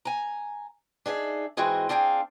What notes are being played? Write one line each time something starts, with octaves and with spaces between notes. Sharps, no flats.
G#5 A#5
D4 D#4 G#4 E5
G#2 E3 C4 F#4 G#4 D#5
C4 D4 G#4 F5 G5